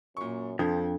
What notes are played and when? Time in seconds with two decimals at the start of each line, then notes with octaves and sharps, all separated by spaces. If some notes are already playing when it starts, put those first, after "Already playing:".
0.17 F#2 A#2 C#6
0.59 F2 F3 D4 A4